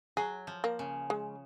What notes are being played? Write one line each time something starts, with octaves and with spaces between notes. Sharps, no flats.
F#3 G#4
F3
A#3
C#3
G#3